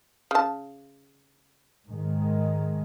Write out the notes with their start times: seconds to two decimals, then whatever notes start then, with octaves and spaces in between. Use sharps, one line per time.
0.31 C#3 A5
1.87 G#2 D#3 G#3